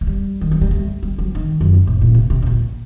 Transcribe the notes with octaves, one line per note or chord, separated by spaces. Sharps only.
A3
G3
D#3
F#3
G3
A3
G3
F#3
D#3
F#2
G2
A2
A#2
C3
C3
C3
A#2